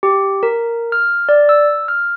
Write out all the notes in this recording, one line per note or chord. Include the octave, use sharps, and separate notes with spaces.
G4
A#4
F6
D5
E6
F6